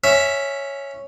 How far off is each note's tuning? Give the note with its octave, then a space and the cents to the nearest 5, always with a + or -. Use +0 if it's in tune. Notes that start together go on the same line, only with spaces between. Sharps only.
C#4 +0 E5 +0